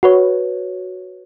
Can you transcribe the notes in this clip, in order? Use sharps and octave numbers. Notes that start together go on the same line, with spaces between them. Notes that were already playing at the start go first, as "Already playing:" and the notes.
F#4 B4 C#5